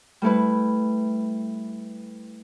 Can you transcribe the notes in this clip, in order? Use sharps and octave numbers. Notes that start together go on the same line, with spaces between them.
G3 A3 E4 B4